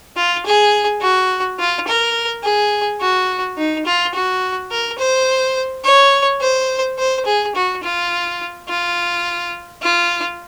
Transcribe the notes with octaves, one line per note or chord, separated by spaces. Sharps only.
F4
G#4
F#4
F4
A#4
G#4
F#4
D#4
F4
F#4
A#4
C5
C#5
C5
C5
G#4
F#4
F4
F4
F4